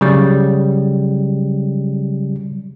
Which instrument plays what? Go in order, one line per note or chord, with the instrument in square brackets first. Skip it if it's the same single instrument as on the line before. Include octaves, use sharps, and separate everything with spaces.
[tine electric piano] C#3 F#3 G3